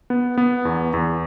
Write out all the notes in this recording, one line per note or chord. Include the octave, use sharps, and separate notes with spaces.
B3
B3
E2
E2